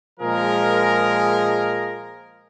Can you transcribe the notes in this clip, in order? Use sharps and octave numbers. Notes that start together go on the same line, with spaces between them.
A#2 F3 G#3 G#4 A#4